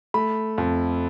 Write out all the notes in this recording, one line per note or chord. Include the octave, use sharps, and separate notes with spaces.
A3 B5
F2